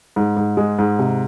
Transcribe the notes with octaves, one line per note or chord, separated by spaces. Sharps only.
G#2
G#2
G#3
G#2
C3